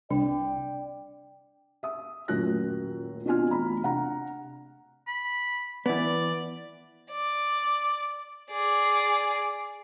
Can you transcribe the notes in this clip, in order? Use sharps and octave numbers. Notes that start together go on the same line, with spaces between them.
C2 D4 D5 G5
E5 D#6
D#1 F#2 A2 F4 F#6 A#6
B2 C4 D4 F4 G#5 F6
E2 A2 A#5 B5
C3 D4 F#5 A#5
B5
E3 B3 D5
D5
G#4 D5